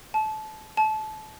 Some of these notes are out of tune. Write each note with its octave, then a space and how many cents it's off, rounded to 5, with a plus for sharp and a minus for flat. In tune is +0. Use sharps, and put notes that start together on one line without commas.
A5 -25
A5 -25